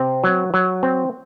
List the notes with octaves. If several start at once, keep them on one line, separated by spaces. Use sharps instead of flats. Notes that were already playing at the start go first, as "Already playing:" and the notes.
Already playing: C3 C4
F#3
F#3
C4